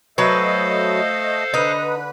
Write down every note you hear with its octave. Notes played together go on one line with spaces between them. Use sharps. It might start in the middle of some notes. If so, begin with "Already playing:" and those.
F#3 A3 A4 B4 C5 D#5 F5
D3 D#4 B4